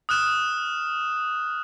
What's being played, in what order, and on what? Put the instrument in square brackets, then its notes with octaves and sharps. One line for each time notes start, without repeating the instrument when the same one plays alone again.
[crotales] D#6 F6 F#6 E7